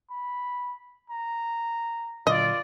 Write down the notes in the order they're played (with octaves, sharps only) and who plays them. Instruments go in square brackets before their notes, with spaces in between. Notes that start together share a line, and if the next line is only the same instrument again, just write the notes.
[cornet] B5
A#5
[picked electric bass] A#2 D3 F#3 [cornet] F4 [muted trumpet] D5 [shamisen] D#5